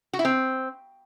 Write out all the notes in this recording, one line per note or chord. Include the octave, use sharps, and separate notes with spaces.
F#4
E4
C4